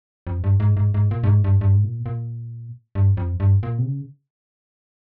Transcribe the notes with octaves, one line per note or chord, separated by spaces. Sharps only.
F2
G2
G#2
G#2
G#2
A#2
G2
G#2
G2
G2
G#2
A#2
A#2
G2
F2
G2
A#2
C3
C#3